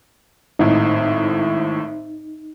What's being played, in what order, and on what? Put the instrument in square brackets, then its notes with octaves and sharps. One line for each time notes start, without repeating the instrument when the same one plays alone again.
[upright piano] G#1 A2 [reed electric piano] D#4